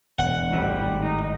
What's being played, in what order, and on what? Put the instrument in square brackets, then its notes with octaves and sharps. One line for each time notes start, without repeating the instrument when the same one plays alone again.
[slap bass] E1 [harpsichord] F#5
[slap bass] G#1 A2 [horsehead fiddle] G3
[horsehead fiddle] D#4